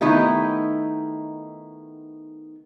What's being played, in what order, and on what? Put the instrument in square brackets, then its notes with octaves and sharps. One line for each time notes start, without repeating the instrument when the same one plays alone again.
[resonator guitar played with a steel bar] D#3 A3 B3 D#4 E4 G4